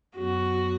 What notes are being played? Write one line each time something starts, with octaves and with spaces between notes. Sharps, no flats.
F#2 F#3 B3 F#4